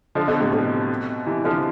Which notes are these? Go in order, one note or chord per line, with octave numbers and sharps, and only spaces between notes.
D3 F3
B2 D3
A2 C3
B2 D3
C3 E3
D3 F3